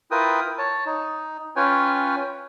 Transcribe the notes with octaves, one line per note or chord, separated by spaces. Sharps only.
E4 F4 A#4 B4 G5 D#6
C#5 A5
D#4
C#4 F4 B4 C#5 G5 G#5